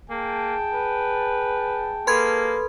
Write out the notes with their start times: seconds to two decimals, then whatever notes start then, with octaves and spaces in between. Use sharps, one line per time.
0.10 A#3 G#4 G5 A5
0.73 B4
2.07 A#3 A4 B4 B5 C6 G#6